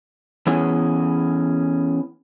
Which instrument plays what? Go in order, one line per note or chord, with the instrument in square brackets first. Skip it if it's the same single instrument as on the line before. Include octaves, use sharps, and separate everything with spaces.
[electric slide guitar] E3 B3 C#4 E4 G#4